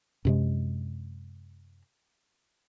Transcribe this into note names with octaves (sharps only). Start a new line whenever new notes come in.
F#2 C3 G#3